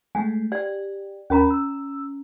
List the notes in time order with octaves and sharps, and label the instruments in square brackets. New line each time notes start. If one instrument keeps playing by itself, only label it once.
[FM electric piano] G#3 A3 [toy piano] G#5
[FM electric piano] G4 [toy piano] D5
[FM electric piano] D#2 A#4 B5 [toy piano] C#4 A#5
[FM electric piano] E6